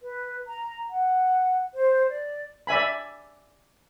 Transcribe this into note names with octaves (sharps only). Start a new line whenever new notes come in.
B4
A#5
F#5
C5
D5
D5 E5 G#5 B5